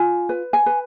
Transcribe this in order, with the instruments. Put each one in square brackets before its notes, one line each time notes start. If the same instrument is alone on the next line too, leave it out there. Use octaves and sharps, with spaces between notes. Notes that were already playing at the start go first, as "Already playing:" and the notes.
Already playing: [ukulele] F4 G#5
B4
G#5
B4